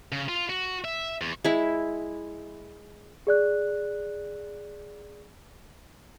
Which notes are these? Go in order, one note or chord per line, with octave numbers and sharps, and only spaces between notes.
C#3
F4
F#4
E5
E2
G#3 E4
G#4 D5 F#6